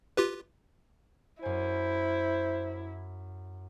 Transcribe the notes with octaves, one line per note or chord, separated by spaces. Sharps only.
F4 G4 B4
F#2 E4 C5 G#5